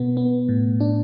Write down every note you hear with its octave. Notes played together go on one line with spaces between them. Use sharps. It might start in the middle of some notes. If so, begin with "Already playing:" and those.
Already playing: B2 B3
B3
A2
D4